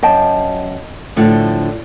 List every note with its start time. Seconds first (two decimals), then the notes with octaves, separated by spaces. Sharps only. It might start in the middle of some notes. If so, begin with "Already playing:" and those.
0.03 F#2 D#5 G5 A5
1.16 A2 D3 F3